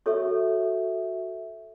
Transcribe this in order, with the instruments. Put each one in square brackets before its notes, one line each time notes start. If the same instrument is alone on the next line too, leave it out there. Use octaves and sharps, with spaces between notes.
[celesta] F#4 E5 [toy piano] A4 C#5 C#6